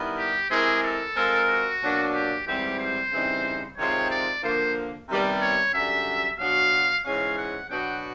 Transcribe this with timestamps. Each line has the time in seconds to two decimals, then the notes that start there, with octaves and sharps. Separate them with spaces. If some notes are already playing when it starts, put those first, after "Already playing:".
Already playing: D#3 G3 B3 E4
0.18 G4
0.51 G#3 C4 E4 G4 G#4 A#4
0.84 A4
1.16 G#3 C4 F4 A#4
1.49 F#4
1.82 B2 F#3 A#3 D4
2.14 G4
2.47 G#2 E3 G3 C4 G4
2.79 C5
3.12 C#3 E3 G3 C4 D#4
3.78 C3 D#3 G#3 C4 F4 C#5
4.11 D5
4.43 D3 F3 A#3 C5
5.09 C3 D#3 G3 B3
5.42 C#5
5.74 F#2 D3 G3 E5
6.39 B2 F#3 B3 D4 F#4 F5
7.05 G#2 E3 G#3 C#4 F5
7.38 F#5
7.70 B2 F#3 B3 D4 F#4 G5